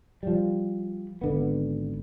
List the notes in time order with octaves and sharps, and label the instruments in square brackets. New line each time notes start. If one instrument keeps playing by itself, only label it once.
[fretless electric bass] F3 G3
G#1 D3 B3